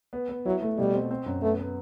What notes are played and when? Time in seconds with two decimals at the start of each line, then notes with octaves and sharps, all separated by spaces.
0.13 B3
0.29 B3
0.45 F#3 E4
0.62 A3
0.78 B2 G3
0.94 C4
1.11 C4
1.26 F#2
1.42 A3 B3
1.59 B3